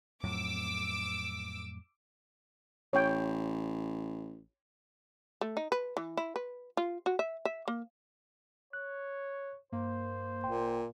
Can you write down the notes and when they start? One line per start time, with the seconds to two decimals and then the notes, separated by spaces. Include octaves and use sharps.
0.24 F2 A2 F#3 D6 E6
2.93 A1 C#5 G5
5.41 A3
5.57 D#4
5.72 B4
5.97 E3
6.17 E4
6.36 B4
6.77 F4
7.06 F#4
7.19 E5
7.45 E5
7.68 A#3
8.73 C#5 F#6
9.72 G2 A#3 C5
10.44 G#1 A#2 G5 C6